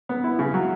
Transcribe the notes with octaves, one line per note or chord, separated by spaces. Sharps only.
B3
E4
C#3
F#3